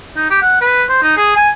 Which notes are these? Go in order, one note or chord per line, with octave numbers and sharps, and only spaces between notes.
D#4
G4
F#5
B4
C5
D#4
G#4
G#5